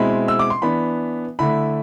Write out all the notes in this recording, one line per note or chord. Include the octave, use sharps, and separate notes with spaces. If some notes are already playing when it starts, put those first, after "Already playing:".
Already playing: B2 G#3 C4 E4 B5
E6
D6
C6
E3 B3 D4 B5
D3 A3 E4 B5